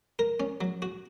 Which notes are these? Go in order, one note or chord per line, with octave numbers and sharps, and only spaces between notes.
A#4
C#4
F#3
F#4